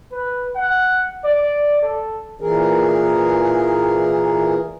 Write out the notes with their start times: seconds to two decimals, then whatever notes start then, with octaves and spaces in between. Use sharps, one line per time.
0.12 B4
0.55 F#5
1.24 D5
1.82 A4
2.40 A#2 E3 G#4 A#4